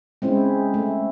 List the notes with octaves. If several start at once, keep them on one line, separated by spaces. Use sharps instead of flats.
G#3 C4 C#4 E4
A3